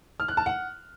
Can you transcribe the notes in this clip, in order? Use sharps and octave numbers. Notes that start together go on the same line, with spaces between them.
F6
F#6
A5
F#5